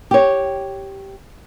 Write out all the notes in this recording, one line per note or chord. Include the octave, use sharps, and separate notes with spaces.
G4 C#5